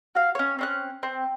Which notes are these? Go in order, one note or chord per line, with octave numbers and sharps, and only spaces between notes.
F#4 F5
C#4 C#5
C4 C#4 F#6
C4